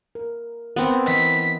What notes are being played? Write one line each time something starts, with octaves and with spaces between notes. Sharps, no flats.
A#4
B3 C4 A#4 B4
E3 D#5 B6